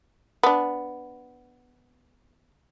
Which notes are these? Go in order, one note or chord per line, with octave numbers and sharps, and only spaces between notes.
B3 D4